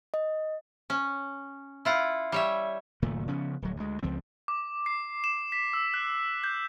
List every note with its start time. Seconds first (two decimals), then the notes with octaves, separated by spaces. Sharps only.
0.14 D#5
0.90 C#4
1.85 E4 F4 F#5
2.32 G3 C#5 E5
3.02 F#1 A#2 D#3 A3
3.28 C#3 F3 B3 C#4
3.62 D1 F#3
3.77 D2 G#3
4.03 C#2 F3 C4
4.48 D6
4.86 C7
5.24 E7
5.52 B6
5.73 E6
5.94 F#6
6.44 G6